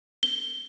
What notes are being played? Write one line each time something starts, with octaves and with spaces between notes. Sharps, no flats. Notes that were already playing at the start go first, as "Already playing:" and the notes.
G7